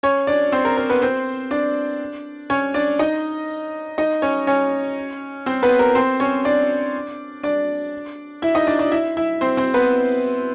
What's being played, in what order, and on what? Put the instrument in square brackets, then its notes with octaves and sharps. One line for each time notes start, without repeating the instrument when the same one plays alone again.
[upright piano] C#4 C#5
D4 D5
C4 C5
A#4
A#4
B3 B4
C4 C5
D4 D5
C#4 C#5
D4 D5
D#4 D#5
D#4 D#5
C#4 C#5
C#4 C#5
C4 C5
B3 B4
A#4
C4 C5
C#4 C#5
D4 D5
D4 D5
E4 E5
D#4 D#5
D4 D5
D4 D5
E4 E5
E4 E5
C4 C5
C4 C5
B3 B4